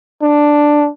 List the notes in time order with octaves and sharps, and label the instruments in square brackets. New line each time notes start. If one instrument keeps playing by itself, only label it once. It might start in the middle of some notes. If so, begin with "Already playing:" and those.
[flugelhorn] D4